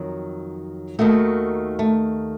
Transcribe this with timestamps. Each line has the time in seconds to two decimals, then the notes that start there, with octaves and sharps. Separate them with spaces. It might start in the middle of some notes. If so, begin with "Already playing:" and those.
Already playing: F2 D#3 F#3
0.99 D#2 D#3 A3 F#4
1.79 A3